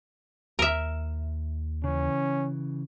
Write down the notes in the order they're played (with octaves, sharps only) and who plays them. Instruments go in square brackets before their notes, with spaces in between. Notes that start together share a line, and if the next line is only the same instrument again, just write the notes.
[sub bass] D#2 [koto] A#4 E5
[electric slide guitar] C#3 E3 [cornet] C#4